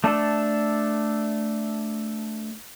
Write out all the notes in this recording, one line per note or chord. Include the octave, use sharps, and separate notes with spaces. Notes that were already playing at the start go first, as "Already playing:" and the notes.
A3 D4 A4